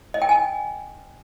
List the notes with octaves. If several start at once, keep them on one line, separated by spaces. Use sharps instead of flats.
D#5
G5
G#5